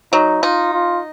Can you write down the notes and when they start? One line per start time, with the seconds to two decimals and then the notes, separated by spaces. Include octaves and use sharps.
0.13 F#3 D#4
0.43 D#4 F4
0.73 F4